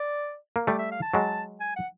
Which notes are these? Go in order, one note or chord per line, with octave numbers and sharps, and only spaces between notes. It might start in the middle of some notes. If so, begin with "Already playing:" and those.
Already playing: D5
A#3
G3 A3 D5
E5
F5
A5
F#3 G#3
G#5
F#5